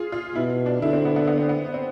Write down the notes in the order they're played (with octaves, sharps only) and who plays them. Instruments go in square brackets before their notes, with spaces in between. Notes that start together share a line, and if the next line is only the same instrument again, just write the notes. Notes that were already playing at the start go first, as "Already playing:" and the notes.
Already playing: [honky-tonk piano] F4 G#4
F4
[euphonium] B2 [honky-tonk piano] E4
[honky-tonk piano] D4
[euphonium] D3 [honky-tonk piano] E4
[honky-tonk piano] C4
B3
B3
B3
C4
B3
C4